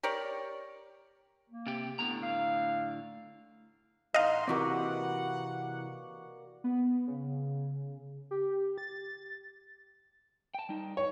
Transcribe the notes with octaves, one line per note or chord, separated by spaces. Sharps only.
G4 A#4 C#5 D5
A#3
C3 G4
A2 D3 B3 A#5
F5
A2 E3 D#4 D#5 F5 F#5 C6
C3 E3 A#3 C4 F#4 B4 D5 F#5
B3
C#3
G4
A6
G5 A5
G3 D#4
C#5